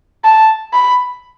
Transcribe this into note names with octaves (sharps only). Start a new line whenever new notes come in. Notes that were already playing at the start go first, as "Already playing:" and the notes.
A5
B5